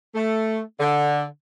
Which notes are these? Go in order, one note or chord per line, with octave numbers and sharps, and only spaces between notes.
A3
D3